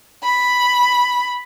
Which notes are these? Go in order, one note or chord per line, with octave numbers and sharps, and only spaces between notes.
B5